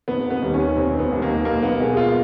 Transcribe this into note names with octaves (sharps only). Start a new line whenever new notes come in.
F1 B3
B3
D#2 D#3 G3
C#4
F1 C4
B3
D#2 D#3 G3
A#3
B1 A#3
B3
B2 G#3
F4